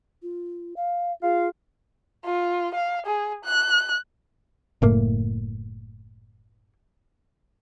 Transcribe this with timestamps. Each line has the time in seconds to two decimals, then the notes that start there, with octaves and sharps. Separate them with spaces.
0.23 F4
0.77 F5
1.23 F4 G#4 F5
2.25 F4
2.75 F5
3.06 G#4
3.44 F#6
4.82 F#1 A2 A#3